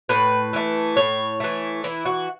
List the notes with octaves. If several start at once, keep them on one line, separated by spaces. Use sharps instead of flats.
A2 B4
E3 A3
A2 C#5
E3 A3
E3 E4
F#4